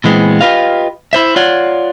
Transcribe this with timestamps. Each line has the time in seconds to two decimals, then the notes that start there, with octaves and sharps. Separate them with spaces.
0.04 A#2 E3 G#3 B3 C4
0.41 F4 G4 B4 D#5 F5
1.13 E4 C5 E5
1.36 F4 C#5 D5 F#5